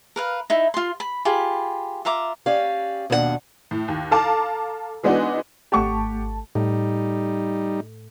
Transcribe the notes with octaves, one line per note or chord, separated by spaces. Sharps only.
A#4 B4 F5
D#4 E4 E5
F4 C6
B5
F4 G4 G#4 B5
F4 E5 A#5 D6
C#4 G4 D5 F5
D#2 B2 D4 A#4 F#5
A2
D#2
A4 F5 A5 A#5 D6
E3 G#3 B3 D4 D#4 F#4
G#1 A3 G4 F#5 A5 C#6
A2 G3 D#4